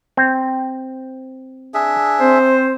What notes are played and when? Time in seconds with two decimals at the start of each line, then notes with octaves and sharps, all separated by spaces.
0.17 C4
1.74 D4 G#4 E5
2.20 C4 C5